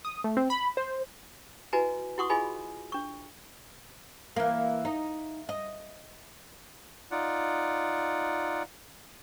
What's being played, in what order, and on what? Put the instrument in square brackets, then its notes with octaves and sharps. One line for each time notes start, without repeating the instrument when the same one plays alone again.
[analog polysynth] D#6
A3
C4
B5
C5
[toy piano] E4 F#4 B4 D#5 G#5 A#5
E4 F#4 F#5 C6 C#6 D#6
E4 F4 G#4 D#5 G#5 B5
D4 C#6
[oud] E3 A#3
D#4
D#5
[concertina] D#4 F4 D5 F#5